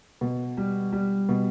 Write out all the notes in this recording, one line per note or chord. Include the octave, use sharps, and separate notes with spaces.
B2
G3
G3
B2